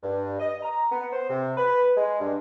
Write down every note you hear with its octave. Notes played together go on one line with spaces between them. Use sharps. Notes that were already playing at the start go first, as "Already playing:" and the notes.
G2
D#5
A#5
B3
C5
C3
B4
G#3
G2